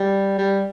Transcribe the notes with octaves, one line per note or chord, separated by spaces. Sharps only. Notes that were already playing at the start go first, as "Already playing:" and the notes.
Already playing: G3
G3